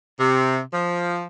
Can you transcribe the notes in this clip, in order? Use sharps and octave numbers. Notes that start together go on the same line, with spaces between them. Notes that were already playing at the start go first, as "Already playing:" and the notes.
C3
F3